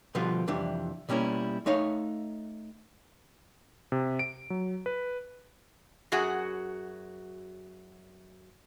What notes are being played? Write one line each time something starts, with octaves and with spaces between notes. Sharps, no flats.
B2 D3 F3 G3 F4 B4
C2 F2 E3 G3 D4
B2 G3 A#3 C#4 E4
A3 D#4 C#5 F5
C3
D7
F#3
B4
F#2 F#4 G#4 F#5